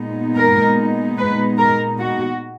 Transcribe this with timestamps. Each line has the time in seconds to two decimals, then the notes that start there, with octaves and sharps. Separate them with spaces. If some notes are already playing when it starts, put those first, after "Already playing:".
Already playing: A#2 G#3 B3 D#4
0.34 A#4
1.17 B4
1.58 A#4
1.99 F#4